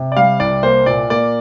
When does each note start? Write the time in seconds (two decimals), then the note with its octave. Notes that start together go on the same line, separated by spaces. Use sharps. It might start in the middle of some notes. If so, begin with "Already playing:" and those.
Already playing: C3
0.12 D5
0.17 G3 F5
0.40 C2 D5
0.63 A#3 C5
0.86 A#2 D5
1.10 A#3 D5